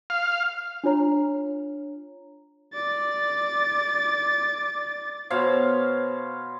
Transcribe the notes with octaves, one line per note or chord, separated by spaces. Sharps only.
F5
D4 F4 C#5 A#5
D5 A6
B2 C5 C#5 F5